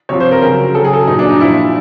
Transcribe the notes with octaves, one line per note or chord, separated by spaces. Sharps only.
C3 F3 C#5
C5
A#4
C#3 F#3 A#4
C#3 F#3 A4
G#4
A4
A#2 F#3 D#4
D4
D#4
A#2 F3 E4